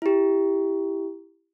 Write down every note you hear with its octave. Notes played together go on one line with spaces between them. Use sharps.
E4 G4